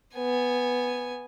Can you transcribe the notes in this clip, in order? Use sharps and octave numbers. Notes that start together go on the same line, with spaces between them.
B3 G#5